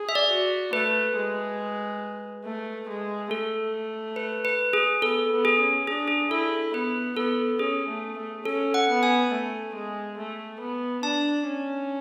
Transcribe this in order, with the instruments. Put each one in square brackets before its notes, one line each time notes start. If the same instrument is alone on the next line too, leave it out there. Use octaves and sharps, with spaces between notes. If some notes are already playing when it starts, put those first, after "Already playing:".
Already playing: [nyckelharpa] G#4
[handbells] E5
D5
[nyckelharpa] F#4
[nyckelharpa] A3 [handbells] B4
[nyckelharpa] G#3
A3
G#3
[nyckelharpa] A3 [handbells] A4
[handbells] B4
B4
G#4
[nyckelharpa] B3 [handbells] A4
[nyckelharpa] B3
[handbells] G#4
[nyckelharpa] C#4
[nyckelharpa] D4 [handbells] G#4
[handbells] G#4
[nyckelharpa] E4 [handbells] A4
[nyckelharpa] B3 [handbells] B4
[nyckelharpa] B3 [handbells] A4
[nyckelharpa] C#4 [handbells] G#4
[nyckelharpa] A3
A3
[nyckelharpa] C#4 [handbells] A4
[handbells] F#5
[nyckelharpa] B3
[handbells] G#5
[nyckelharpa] A3
G#3
A3
B3
[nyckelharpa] D4 [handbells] A5
[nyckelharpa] C#4